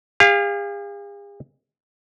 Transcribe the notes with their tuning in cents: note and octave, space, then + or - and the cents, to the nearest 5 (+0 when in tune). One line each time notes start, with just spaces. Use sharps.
G#4 -45 F5 +0